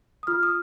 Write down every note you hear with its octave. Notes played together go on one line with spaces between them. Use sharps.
D#6
F4 F6
D#6